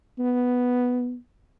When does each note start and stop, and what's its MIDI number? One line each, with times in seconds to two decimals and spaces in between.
0.19 1.16 59